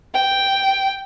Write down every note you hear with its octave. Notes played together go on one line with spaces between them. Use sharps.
G5